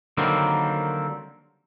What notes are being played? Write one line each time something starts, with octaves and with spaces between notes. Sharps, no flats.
D3 D#3 F#3 G3 A#3 C4